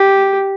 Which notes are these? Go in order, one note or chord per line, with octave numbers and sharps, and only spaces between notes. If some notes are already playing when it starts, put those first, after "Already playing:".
Already playing: G4